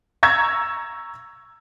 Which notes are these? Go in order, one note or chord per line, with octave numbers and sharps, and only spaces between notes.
A#5 C#6 E6 G#6